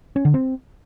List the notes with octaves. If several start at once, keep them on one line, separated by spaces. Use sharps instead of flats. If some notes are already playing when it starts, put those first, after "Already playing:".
C#4
D3
C4